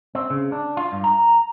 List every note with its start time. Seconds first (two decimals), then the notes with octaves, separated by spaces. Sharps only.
0.15 C4
0.30 C#3
0.52 D4
0.77 F4
0.92 G2
1.04 A#5